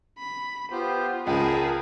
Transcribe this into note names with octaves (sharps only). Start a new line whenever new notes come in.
B5
B3 F4 G4 C5
C#2 G#4 A#4 A5 B5